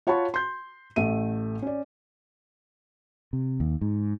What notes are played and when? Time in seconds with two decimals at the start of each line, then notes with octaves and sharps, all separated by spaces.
0.07 F4 C#5 F#5 A5 B5 C#6
0.34 C6 G6
0.96 A1 A3 E5 D#7
1.62 C#4 D5
3.33 C3
3.60 D#2
3.81 G#2